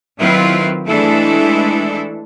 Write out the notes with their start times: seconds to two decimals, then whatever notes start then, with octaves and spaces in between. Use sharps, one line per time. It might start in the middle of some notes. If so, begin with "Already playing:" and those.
0.20 D#3 F#3 C4 E4 F4 B4
0.88 E3 G#3 A3 D4 E4 A4